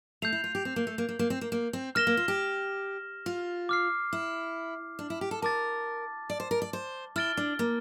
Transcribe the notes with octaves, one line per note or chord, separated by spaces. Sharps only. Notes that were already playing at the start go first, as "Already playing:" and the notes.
A3 G6 C7 F7
E4
F4
G4
C4
A#3
A3
A#3
A#3
A#3
C4
A#3
A#3
C4
A#3 F6 A#6 E7 G7
A#3
F4
G4
F4
D6 F6 C7
E4
D4
E4
G4
A4
A#4 A5 D6 A6
D5
C5
A#4
D5
C5
E4 F6 A6 D7 G7
D4
A#3